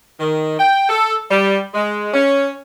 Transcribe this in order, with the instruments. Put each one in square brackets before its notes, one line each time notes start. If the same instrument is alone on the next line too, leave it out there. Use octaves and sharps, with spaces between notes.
[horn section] D#3
G5
A4
G3
G#3
C#4